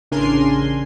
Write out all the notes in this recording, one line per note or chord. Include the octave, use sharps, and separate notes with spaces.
A1 C#3 D4 A#4 G#5 C6